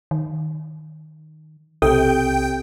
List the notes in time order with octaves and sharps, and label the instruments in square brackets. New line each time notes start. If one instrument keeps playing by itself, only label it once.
[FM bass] D#3
[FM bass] B1 [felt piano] C3 [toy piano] A4 [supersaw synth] G5